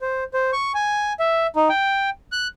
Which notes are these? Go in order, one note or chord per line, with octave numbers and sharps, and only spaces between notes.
C5
C5
C#6
G#5
E5
D#4
G5
F#6